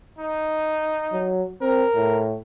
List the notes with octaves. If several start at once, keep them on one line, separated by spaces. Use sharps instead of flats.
D#4
F#3
C4 A#4
A2